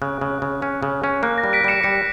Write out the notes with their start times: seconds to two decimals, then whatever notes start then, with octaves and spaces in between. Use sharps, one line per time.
0.02 C#3 F#6
0.21 C#3
0.42 C#3
0.62 C#4
0.83 C#3
1.04 C#4
1.23 A#3 F#6
1.38 A#6
1.44 G3
1.53 B6 D7
1.64 G3 C#7 E7
1.83 G3 C#7 E7